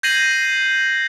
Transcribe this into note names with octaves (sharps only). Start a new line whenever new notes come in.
G6 G#6 A#6 C7 D#7 F#7